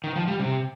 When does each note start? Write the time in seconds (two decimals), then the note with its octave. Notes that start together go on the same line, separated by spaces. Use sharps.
0.04 D#3
0.16 F3
0.28 G3
0.40 C3